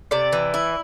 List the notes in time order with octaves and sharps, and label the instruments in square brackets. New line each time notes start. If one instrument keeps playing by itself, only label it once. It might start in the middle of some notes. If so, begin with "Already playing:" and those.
[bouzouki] C3 [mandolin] D5
[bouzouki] E3
E4